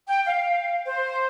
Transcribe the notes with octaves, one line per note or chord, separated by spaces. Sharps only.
G5
F5
C5